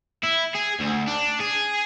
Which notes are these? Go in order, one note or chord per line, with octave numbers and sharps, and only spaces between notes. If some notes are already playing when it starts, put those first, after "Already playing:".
E4
G#4
D2
D4
G#4